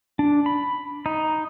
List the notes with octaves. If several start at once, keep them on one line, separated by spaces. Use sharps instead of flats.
D4
B5
D#4